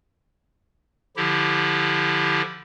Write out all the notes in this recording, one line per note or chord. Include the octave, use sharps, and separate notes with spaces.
D3 F3 E4 G4